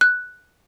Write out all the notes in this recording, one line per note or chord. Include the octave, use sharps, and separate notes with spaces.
F#6